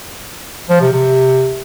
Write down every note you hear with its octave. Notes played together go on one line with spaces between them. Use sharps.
F3
C3
C3